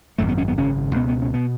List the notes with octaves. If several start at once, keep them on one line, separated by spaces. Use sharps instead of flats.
G#1 F#2 C#3 A3
B3
C#4
B3
G#1 F#2 C#3 C#4
C#2 B2 B3
B3
C#4
B2 B3